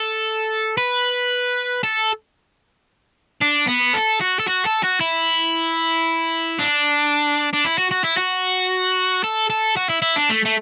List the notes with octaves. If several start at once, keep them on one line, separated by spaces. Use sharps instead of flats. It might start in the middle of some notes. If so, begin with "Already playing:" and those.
Already playing: A4
B4
A4
D4
B3
A4
F#4
A4
F#4
A4
F#4
E4
D4
D4
E4
F#4
F#4
E4
F#4
A4
A4
F#4
E4
E4
D4
A3
A3